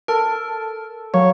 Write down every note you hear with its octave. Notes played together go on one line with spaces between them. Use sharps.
A4 A#4
F#3 A#3 C#5